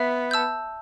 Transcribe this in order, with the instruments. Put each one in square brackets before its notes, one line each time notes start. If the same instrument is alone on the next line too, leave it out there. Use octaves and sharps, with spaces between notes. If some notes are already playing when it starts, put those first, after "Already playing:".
Already playing: [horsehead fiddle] B3 [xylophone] E5
[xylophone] A5 E6 G6